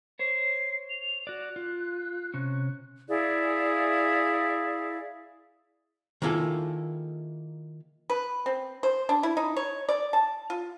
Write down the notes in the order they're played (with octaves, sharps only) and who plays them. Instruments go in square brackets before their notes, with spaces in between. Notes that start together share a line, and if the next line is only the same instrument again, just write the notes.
[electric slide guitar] C5 C#5 [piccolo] C7
[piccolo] F7
[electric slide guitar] F#4 D5 [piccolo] F#6
[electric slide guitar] F4
C3 C#4
[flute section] E4 G#4 D5 F5
[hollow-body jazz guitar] D#3 A#3 E4 F4 G#4 A4
[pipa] B4
C4
C5
D4
E4
D#4
C#5
D5
A5
F4